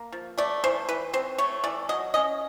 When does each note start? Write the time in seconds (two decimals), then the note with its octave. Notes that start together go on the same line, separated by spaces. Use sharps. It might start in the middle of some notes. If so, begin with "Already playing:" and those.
Already playing: A#3
0.12 F3
0.38 A3 D5
0.64 E3 C5
0.89 E3 B4
1.13 C4 C5
1.38 A3 C#5
1.64 E3 D5
1.89 F#3 D#5
2.14 C#4 D#5